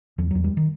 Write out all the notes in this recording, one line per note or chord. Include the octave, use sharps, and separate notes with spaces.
E2 F3
F#3
E2
G3
D#3